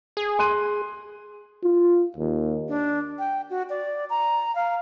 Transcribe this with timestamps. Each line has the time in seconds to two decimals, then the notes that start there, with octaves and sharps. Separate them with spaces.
0.17 G#4
0.39 C6 F#6 D#7
1.63 F4
2.17 D#2
2.68 D4
3.19 G5
3.50 F#4
3.70 D5
4.10 A#5
4.55 F5